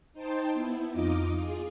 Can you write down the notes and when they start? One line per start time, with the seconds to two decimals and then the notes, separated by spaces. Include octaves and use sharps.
0.13 D#4 C5 G5 A5
0.53 B3 E4
0.90 F2 D#4 F4 D#5 D6
1.37 F4 G#4